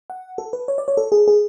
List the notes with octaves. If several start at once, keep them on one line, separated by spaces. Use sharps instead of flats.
F#5
A4
B4
C#5
D5
C#5
A4
G#4
G#4